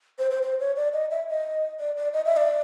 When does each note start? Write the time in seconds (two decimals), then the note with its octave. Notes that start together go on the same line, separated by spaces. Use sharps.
0.19 C5
0.31 C5
0.43 C5
0.60 C#5
0.76 D5
0.93 D#5
1.11 E5
1.29 D#5
1.79 D5
1.97 D5
2.13 D#5
2.25 E5
2.37 D5